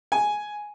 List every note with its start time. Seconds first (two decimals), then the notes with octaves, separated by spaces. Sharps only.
0.12 G#5